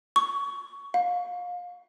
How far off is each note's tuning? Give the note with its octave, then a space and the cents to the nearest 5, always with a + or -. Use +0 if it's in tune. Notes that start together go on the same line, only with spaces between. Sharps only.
C#6 +20
F5 +30